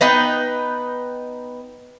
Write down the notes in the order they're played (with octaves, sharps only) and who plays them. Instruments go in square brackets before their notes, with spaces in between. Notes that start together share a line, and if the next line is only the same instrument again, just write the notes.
[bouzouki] B3 D#4 B4 G5